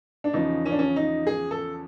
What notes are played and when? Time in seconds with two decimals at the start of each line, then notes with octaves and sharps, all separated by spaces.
0.24 D4
0.33 E2 C#3 F3 D#4
0.65 C#4
0.72 D4
0.79 C#4
0.96 D#4
1.27 G#4
1.51 A4